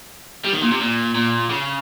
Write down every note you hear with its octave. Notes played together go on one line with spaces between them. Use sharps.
G3
D#3
A#2
C3
A#2
A#2
C#3